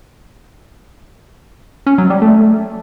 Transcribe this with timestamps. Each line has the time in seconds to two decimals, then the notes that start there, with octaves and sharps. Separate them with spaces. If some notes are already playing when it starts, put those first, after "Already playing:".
1.86 C#4
1.98 F#3
2.10 G3
2.22 A3